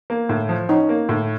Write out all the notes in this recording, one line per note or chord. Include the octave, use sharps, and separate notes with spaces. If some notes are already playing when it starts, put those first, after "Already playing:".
A#3
A2
F3
C#4 D#4
A#3
A2